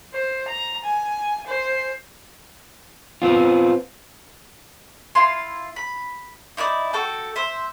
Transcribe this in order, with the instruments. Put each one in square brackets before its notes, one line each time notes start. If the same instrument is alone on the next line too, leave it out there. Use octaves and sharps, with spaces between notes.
[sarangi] C5
A#5
G#5
C5
[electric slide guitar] B3 C4 F4
[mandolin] E4 F4 C6
B5
D#4 E4 C5 D5
F#4 A4 G5
C5 E5